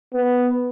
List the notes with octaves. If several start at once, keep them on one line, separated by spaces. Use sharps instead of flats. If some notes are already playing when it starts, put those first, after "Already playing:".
B3